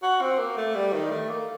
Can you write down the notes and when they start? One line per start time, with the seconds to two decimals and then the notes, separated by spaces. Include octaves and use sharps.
0.03 F#4
0.21 C4
0.39 A#3
0.57 A3
0.75 G3
0.93 D#3
1.11 A3
1.29 A#3